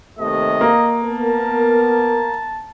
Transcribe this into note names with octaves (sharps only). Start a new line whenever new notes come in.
D#2 C3 A3 D#5
A#3
B3 A#4 A5